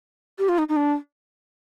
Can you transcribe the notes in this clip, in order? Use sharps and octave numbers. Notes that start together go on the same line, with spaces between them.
G4
F4
D#4
D#4
D4